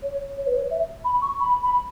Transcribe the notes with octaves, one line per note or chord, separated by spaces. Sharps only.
C#5
C#5
B4
C#5
E5
B5
C#6
B5
B5